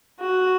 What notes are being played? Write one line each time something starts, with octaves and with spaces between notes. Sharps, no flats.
F#4